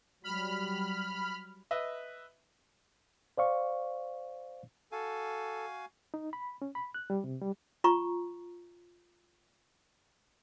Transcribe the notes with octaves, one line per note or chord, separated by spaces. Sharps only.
F#3 G3 B5 F6
B4 D#5 E5
C5 D5 F5 C#6
F#4 A4 F5 G#5
D#4
B5
C#4
B5
F#6
G3
C3
G3
F4 A#5 C#6